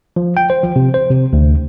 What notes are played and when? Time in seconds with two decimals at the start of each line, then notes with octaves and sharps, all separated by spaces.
0.16 F3
0.37 G5
0.50 C5
0.63 F3
0.76 C3
0.94 C5
1.10 C3
1.33 D2